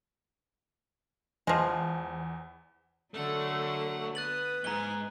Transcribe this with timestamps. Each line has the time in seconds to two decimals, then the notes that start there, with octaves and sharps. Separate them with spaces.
1.47 E2 F3 G#3
3.14 D3 F#3 A3 A#4 F#5
4.15 B3 B4 D#6 F#6 A6 F#7
4.64 F2 G#2 G#5 A#5 G7